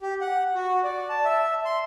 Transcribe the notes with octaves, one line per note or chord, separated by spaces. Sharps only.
G4
F#5
F#4
D5
A5
E5
C6